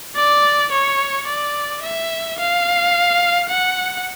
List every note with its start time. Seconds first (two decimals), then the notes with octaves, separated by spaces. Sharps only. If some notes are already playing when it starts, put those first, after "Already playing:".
0.16 D5
0.72 C#5
1.27 D5
1.83 E5
2.39 F5
3.50 F#5